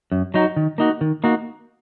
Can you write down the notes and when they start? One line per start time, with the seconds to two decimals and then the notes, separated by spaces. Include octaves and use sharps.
0.12 F#2
0.34 F#3 D#4 F#4
0.56 D#3
0.78 A#3 D#4 F#4
1.01 D#3
1.24 A#3 D#4 F#4